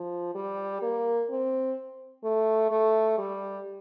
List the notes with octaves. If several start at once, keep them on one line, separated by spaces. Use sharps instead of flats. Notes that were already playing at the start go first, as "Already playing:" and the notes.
Already playing: F3
G3
A#3
C4
A3
A3
G3